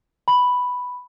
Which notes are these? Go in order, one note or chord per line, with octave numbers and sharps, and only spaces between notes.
B5